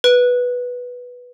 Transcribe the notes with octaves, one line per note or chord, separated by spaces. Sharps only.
B4